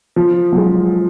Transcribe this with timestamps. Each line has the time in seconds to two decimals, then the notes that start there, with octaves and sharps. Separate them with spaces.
0.16 F3
0.53 F#3
0.57 G#3